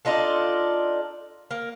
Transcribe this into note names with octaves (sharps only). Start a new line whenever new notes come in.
D4 D#4 F4 A4
A#3